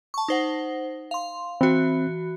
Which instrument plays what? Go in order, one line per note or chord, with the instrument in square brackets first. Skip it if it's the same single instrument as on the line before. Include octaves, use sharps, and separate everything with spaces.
[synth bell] A5 C#6
D#4 C5 F#5
F5 C6
[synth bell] E3 F#4 [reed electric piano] C4